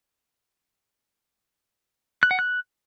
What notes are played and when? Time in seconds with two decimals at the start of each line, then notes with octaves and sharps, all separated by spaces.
2.23 F#6
2.31 F#5
2.39 F#6